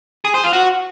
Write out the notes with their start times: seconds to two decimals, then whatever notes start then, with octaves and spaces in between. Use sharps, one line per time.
0.25 G#4
0.34 C5
0.44 F4
0.53 F#4